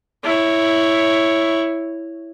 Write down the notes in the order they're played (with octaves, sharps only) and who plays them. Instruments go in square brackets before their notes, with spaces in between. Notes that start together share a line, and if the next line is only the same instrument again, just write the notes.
[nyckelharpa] E4 C#5